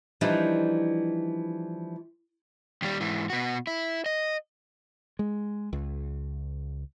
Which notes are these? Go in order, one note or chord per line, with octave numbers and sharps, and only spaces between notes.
E3 F3 G3 D4 D#4
D#2 G3
G#2 E3
B2 F#4
E4
D#5
G#3
C#2